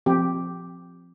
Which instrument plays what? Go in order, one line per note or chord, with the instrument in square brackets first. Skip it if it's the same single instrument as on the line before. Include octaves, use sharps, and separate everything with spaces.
[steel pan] F3 C4 G4